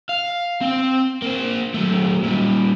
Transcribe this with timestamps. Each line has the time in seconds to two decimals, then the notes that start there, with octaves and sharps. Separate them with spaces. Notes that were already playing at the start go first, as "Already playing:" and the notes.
0.09 F5
0.61 C4 G5
1.22 A#3 C5
1.74 F#3 A3
2.24 A#2 G3